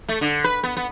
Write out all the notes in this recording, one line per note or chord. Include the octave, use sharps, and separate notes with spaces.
A3
D3
B4
B3
B3